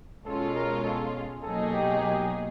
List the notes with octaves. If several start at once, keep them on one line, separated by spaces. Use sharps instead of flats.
B2 G#3 C#4 F4 A4
A#4
A4
B2 F#3 A#3 D#4 G#4 A4
G4
G4